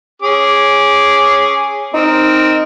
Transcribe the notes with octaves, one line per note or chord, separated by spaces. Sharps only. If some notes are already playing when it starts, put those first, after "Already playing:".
C#4 G#4 D6
C4 D#4 A#4